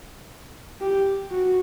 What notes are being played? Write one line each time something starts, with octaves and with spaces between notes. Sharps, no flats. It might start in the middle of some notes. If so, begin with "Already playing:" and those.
G4
F#4